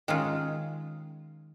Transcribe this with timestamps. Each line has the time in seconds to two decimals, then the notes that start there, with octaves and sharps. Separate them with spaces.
0.08 D#3 G#3 C#4 F4